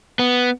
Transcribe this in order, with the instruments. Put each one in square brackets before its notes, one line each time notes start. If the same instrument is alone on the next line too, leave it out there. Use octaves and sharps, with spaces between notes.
[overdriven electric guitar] B3